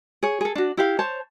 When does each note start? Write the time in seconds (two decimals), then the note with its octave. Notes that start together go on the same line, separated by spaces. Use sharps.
0.23 G#4 C#5
0.41 G#4 A4
0.55 D4 F#4
0.77 E4 G4 F5
0.99 C5 C#5 A5